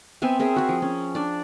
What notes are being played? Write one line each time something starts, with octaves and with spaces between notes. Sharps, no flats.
B3 C4 E5 G#5
C4 G#4 A#4 E5
F#4 G#4
F3
C#4
D4 D5